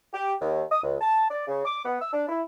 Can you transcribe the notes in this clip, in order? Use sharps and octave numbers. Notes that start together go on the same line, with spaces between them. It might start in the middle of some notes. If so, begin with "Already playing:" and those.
G4
D#2
D#6
C#2
A5
D5
C#3
D6
B3
E6
D4
E4